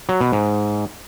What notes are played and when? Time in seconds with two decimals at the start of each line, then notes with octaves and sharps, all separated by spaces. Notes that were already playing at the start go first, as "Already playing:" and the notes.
0.09 F#3
0.21 B2
0.32 G#2